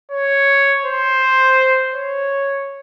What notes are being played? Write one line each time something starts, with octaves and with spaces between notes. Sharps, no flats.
C#5
C5
C#5